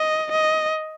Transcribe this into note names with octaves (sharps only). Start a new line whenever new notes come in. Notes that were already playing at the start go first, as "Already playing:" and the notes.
Already playing: D#5
D#5